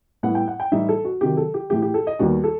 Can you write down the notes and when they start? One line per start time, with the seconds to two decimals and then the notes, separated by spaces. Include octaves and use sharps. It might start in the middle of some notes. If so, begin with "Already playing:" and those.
0.23 A2 G3 B3 E4 F#5
0.35 G5
0.48 F#5
0.60 G5
0.72 A2 E3 G3 D#4 E5
0.89 A4
1.05 F#4
1.21 C3 D#3 F#3 G4
1.37 A4
1.54 G4
1.69 A2 E3 A3 E4 G4
1.82 G4
1.94 A4
2.07 D#5
2.19 D#2 D#3 G3 B3 F#4
2.44 A4